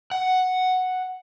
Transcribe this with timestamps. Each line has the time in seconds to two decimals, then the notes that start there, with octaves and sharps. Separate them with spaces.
0.11 F#5